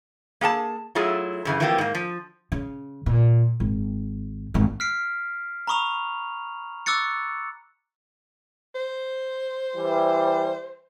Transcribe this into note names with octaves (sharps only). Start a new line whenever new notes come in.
A#3 G#4 G5 A5
F#3 A3 E4 F4 G#4
F#2 C#3 E3
E3 F3 A3 A#3 C4 G4
G#2 A#3
F3
C#3
A#2
G#1
G#1 D#3
F6 B6 C7 D7
A#5 B5 C#6 D#6 F7
C#6 D6 E6 F#6 A6 C#7
C5
E3 G3